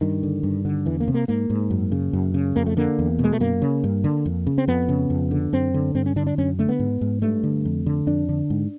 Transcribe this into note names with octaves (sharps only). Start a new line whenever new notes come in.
G2 D#3
D3
G2
D3
E2 E3
A#3
C3
A#3
G#2 A#3
G#2
F#2
C#3
F#2
C#3
F2 A#3
A3
D3 A#3
E2
B2
G#3
A3
F#2 A#3
C#3
G2
D3
F2
C#3
C4
F2 B3
C#3
F2
D3
F#2 C4
D3
G2 C4
C#4
D3 D4
D4
F#2 C#4
D3 A3
B3
G#2
G#2
G2 A3
D3
F2
D3
F2 D4
D3
G#2